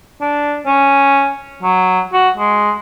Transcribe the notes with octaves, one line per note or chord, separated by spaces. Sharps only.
D4
C#4
F#3
F#4
G#3